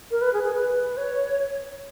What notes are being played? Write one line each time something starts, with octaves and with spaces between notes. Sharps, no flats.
A#4
B4
G#4
G#4
B4
C#5